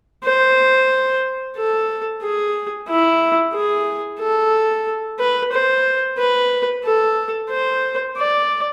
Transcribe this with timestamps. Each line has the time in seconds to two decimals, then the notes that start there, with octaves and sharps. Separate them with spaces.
0.25 C5
1.57 A4
2.22 G#4
2.88 E4
3.54 G#4
4.20 A4
5.19 B4
5.53 C5
6.18 B4
6.84 A4
7.51 C5
8.17 D5